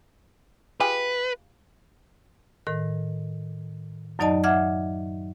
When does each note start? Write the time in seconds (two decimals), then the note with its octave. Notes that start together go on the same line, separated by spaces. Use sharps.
0.80 F4 G4 G#4 B4
2.67 A2 D#3 A#4
4.19 F#2 F#3 D#4 D5 D#5 A5
4.44 E5 F#5 D6 F6 G#6